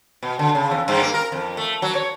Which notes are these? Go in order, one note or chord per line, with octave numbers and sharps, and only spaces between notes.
B2
D3
C#3
E2
G2
A#3
A#4
F2
A3
F#3
C#5